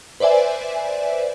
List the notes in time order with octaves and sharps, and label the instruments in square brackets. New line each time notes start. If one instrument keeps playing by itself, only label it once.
[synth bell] B4 C5 D5 E5 G#5